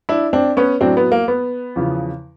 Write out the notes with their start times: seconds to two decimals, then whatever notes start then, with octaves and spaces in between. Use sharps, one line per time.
0.09 D4 E4
0.33 C4 D4
0.57 B3 C#4
0.81 A2 F#3 C4 D4
0.97 B3
1.12 A#3
1.28 B3
1.76 E2 C#3 F3